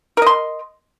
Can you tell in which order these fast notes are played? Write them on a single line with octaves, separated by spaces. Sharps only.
A#4 D#5 C6